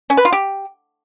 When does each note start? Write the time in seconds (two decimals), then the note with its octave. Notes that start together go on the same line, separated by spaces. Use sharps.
0.10 C#4
0.17 B4
0.25 F4
0.32 G4